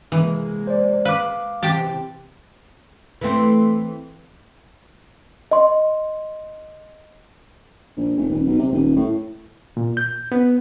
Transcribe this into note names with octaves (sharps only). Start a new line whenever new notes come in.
C3 E3 G#3 A#3
C5 D5
B4 F5 D6
C3 E3 C4 G4 G5 A5
E3 A3 C4
D#5 C6
A#1
F1
D#1
B1
C3
D#1
A2
A#2
G6
B3